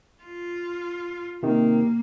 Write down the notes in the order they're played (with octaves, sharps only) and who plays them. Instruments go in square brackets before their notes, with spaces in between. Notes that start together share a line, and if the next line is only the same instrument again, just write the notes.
[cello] F4
[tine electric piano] C3 D#3 [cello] A#3